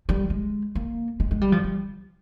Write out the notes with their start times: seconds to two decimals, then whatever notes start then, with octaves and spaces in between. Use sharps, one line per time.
0.09 G3
0.30 G#3
0.75 A#3
1.20 G#3
1.31 G#3
1.41 G3
1.52 F3
1.64 G3